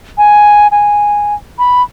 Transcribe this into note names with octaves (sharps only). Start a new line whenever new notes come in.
G#5
G#5
B5